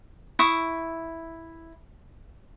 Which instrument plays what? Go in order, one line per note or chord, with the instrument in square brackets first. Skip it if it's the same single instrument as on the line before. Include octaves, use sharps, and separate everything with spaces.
[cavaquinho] E4 C#6 D#6